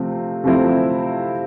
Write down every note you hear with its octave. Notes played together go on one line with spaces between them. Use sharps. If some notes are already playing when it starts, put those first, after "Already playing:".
Already playing: C3 F3 A3 C4
C3 F3 A3 C4 E4